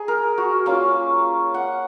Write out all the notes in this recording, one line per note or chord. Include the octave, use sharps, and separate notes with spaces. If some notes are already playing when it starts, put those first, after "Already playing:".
Already playing: D#4 G#4
A#4
F#4
A#3 C#4 F4 F5
F#5